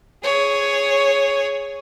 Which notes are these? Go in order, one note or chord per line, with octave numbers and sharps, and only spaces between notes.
G#4 C#5